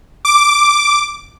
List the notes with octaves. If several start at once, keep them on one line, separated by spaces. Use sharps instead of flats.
D6